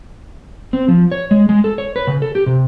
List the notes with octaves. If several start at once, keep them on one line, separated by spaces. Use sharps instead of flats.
C4
F3
C#5
G#3
G#3
A4
C#5
B4
C#3
A4
G4
C3